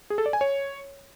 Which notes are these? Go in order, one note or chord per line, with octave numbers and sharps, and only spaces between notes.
G#4
A4
D5
G#5
C#5